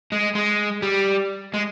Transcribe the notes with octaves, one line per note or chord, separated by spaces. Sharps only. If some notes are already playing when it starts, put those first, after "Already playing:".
G#3
G#3
G3
G#3